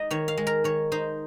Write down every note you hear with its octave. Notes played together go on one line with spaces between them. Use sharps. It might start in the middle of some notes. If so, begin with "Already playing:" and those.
Already playing: G#3 D#4 D#5
D#3 C#5
F5
G#3
A#4
D#3 C#5
D#4 C5